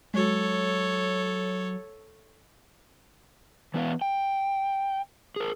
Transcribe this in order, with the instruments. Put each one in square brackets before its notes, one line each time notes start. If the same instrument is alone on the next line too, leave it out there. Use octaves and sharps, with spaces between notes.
[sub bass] F#3 [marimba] G#3 F#4 [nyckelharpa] A4 C#5
[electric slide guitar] E3 B3 B4 F5
G5
G#4 A#4